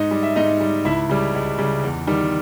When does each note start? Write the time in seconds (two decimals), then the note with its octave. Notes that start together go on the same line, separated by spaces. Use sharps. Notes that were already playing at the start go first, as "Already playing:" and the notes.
Already playing: G#2 D#4 D#5
0.11 G3
0.23 E5
0.36 G#2 D#4 D#5
0.60 G3
0.85 C#2 E4 E5
1.09 C#3 G3
1.35 C#2
1.58 C#3 G3
1.84 E2
2.07 D#3 G3